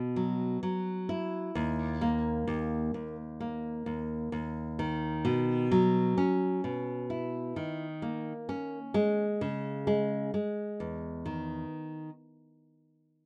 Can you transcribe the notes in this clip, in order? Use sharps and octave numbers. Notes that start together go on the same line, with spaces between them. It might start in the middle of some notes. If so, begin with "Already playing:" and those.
Already playing: B2
F#3
F#3
E4
D#2
A#3
D#2
D#2
A#3
D#2
D#2
D#3
B2
F#3
C#4
B2
E4
D#3
A#3
C#4
G#3
C#3
G#3
G#3
E2
D#3